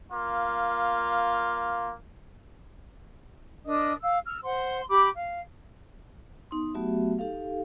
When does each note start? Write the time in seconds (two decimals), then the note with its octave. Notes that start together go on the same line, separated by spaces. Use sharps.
0.12 A#3 F4
3.64 D4 A#4 D#5 D#6
4.01 F5 E6
4.25 E6 F6
4.41 C5 F#5 C6
4.88 G4 B5 D6
5.13 F5
6.51 B3 D#4 C6
6.74 F#3 A3 B3 F#4 G4 E5
7.19 D#4 G4 A4 F5